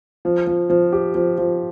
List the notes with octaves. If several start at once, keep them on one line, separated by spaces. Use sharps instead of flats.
F3
F3
F3
G4
F3
F3